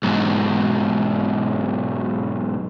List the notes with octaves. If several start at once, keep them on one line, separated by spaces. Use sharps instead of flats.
B1 G#2